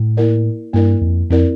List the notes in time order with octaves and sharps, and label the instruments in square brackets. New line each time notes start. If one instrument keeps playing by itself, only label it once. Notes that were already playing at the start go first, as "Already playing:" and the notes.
Already playing: [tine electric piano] A2
[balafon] A#3 E4 A#4 D5
[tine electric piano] G2 [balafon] A#3 E4 A#4 D5
[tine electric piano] F2
[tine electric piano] F2 [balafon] C4 E4 A#4 D5